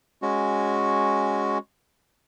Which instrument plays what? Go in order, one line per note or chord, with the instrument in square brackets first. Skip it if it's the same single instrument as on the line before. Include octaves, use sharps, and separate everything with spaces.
[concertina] G#3 C#4 F#4